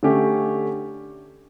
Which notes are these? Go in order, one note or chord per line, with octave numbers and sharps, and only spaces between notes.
D3 A3 C#4 G4